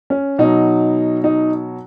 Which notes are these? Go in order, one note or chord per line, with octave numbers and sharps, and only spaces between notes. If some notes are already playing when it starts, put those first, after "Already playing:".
C#4
B2 F#3 D#4
D#4